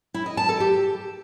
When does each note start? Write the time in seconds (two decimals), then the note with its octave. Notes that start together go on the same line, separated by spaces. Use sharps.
0.14 E4
0.26 D#5
0.37 A5
0.49 A4
0.60 G4